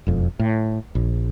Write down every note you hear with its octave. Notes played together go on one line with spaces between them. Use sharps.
E1 F2
A2
A#1